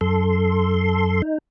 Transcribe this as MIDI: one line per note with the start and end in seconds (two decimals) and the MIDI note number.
0.01 1.22 42
0.01 1.22 69
0.01 1.22 84
1.22 1.38 63